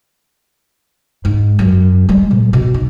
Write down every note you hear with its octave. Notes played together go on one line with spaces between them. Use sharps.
G#2
F#2
G3 G#3
A#2
B2
D#4